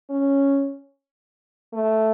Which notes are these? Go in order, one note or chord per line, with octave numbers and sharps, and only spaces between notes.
C#4
A3